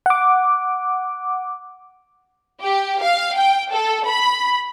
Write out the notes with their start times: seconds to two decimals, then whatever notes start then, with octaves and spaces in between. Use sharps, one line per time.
0.06 F#5 D6
2.62 G4
3.01 F5
3.35 G5
3.72 A4
4.06 B5